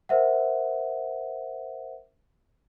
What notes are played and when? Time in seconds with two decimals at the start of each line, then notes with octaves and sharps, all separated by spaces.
0.09 A#4 C5 E5 F#5